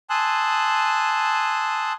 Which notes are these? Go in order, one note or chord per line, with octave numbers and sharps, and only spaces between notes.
G#5 A5 C6 D#6 E6 F#6